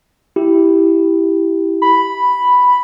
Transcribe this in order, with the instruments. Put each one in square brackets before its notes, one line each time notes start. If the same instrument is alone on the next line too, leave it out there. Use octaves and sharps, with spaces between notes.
[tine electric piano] E4 G4
[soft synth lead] B5